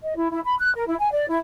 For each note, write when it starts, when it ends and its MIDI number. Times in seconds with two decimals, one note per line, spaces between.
0.04 0.16 75
0.17 0.28 64
0.31 0.40 64
0.44 0.55 83
0.59 0.72 90
0.75 0.87 70
0.87 0.95 64
0.99 1.11 80
1.12 1.28 74
1.29 1.36 64